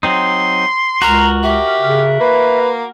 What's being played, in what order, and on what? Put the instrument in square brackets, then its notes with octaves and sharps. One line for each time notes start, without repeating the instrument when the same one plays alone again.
[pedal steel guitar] F#3 C4 D#4 [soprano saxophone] C6
[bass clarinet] C#2 [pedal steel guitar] F#4 A#4 [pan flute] A#5
[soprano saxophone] G4 [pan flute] E5
[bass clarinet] C#3
[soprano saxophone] A#3 [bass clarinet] B4